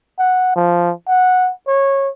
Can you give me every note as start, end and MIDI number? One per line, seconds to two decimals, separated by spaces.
0.19 0.53 78
0.56 0.92 53
1.07 1.51 78
1.68 2.09 73